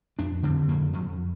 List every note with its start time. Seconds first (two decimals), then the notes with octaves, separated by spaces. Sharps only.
0.19 F2 D4
0.43 D3 C4
0.68 F2 A#3
0.93 F2